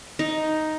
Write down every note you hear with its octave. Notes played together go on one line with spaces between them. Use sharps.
D#4